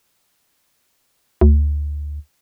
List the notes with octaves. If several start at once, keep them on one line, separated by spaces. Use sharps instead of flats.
D2